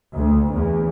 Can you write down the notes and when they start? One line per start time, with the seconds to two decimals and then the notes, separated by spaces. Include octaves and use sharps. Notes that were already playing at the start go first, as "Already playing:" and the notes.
0.15 D2
0.53 E2